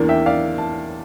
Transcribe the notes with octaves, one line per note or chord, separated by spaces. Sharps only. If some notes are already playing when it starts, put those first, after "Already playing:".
Already playing: E2 E3 A#3 D4
E5 G5
D5 F5
A5